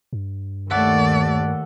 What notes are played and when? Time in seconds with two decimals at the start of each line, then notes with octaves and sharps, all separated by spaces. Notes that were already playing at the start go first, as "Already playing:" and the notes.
0.13 G2
0.70 D#2 A3 A4 D5 E5 F#5